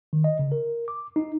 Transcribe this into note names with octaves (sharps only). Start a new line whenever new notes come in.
D#3
D#5
C#3
A#4
D6
D#4